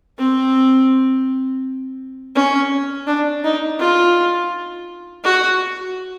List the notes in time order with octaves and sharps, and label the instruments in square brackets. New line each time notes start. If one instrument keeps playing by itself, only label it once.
[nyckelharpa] C4
C#4
D4
D#4
F4
F#4